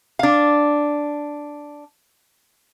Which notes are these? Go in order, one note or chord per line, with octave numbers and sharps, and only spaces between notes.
D4 F5